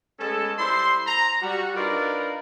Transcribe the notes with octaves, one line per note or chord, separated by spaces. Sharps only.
G#3 A3 B3 C#4 A4
G3 E4 C5 E5 C6
A#5
G3 F#4
D4 D#4 F4 A#4 B4 D5